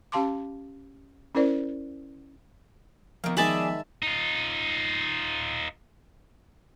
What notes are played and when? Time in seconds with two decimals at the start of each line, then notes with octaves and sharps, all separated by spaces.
0.12 C#4 G4 F5 A5 C6 D6
1.35 C#4 E4 A#4 C5 D5
3.24 D#3 F3 A#3 B3
3.37 D#3 G#3 D4 G#4 D5 E5 A5 B5
4.03 D#4 F4